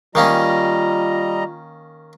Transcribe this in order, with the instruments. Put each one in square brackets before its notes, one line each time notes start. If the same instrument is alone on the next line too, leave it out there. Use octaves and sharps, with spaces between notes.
[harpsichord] D#3 A#3 C#4 [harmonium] G3 D#5 A#5 [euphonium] F4